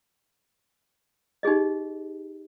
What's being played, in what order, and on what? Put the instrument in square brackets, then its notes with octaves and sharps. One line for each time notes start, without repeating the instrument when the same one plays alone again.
[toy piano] D#4 G4 G#4 D#5